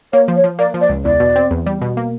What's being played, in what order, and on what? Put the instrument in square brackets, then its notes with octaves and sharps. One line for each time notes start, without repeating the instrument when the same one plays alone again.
[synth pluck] A#3 [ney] C#5
[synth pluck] F3
[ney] C#5
[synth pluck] F3
[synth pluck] A#3 [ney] D5
[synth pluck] F3
[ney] D5
[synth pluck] C#2
[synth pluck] E2 [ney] D5
[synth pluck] B2
C4
E2
G3
B2
A#3